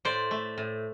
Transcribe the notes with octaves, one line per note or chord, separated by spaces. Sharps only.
A2 C5 D5
A3
A2